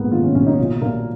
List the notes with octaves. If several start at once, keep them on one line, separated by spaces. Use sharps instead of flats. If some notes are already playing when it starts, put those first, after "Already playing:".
Already playing: A#1 G#2 A#3 B3
D#3 F4
C#4
A#1 C#4
D#4
B1 F4
A#2 A#3